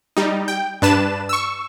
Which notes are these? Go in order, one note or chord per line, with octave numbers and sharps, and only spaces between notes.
G3 D#4
G5
G2 D4 B4 A5 E7
C#6 E6